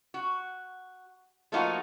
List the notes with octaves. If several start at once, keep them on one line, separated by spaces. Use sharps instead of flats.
F#4
F3 A3 A#3 D#4 F4 F#4